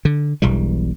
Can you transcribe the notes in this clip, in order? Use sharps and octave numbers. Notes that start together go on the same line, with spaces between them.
D3
E1 B1 E3 G3